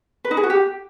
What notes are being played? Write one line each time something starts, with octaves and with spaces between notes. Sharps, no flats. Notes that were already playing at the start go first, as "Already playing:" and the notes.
B4
D#4
G#4
F#4
G4